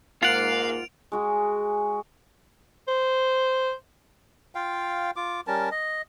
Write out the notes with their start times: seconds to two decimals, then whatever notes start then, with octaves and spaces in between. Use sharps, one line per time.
0.23 G#2 A#3 F4 F5 F#5 D7 F7
1.12 G#3 F#4 G#4
2.88 C5
4.55 F4 F5 G5
5.16 F4 D6
5.47 G3 C#4 A#4 A5
5.71 D#5